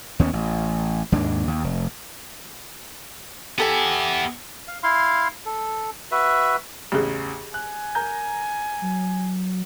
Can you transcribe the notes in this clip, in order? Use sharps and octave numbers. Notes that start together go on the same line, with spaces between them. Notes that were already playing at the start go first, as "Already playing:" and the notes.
D#2 B3 C#4
A1
D#2 G#2 D4
D#2
F1
B3 G4 A4 E5 G#5
F5
E4 F5 C6
A4
F#4 B4 E5
A1 E2 C#3 G4 G#4
G#5 F#6
A#4 A#5 G6
F#3